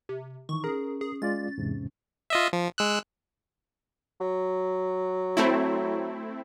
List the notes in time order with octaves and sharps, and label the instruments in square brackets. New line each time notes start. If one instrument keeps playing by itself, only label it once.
[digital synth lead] C3
[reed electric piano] D#3 E3 [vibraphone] D#4 [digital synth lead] C#6
[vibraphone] C#4 [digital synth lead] G#4 [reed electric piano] A#4
[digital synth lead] G#4
[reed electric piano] G#3 F4 D5 [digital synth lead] A6
[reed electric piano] E2 G#2 C3
[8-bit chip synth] F4 D#5 E5
F3
G#3 E6 F#6
[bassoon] F#3
[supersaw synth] A3 C4 E4